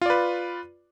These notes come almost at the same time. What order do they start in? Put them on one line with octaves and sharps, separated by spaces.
F4 D5 B4